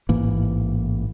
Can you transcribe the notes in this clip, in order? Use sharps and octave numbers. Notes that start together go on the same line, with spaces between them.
A1 G#2 E3 A#3